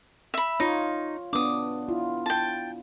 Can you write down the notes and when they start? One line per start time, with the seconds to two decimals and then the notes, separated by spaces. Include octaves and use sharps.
0.34 E5 B5
0.60 D#4 F4 C#5
1.33 B3 D4 D6 D#6
1.88 E4 F4
2.26 G5 A5